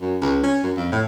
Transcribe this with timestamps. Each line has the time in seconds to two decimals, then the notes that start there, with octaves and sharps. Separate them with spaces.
0.01 F#2
0.22 C#2
0.44 C#4
0.64 F#2
0.77 F2
0.92 A2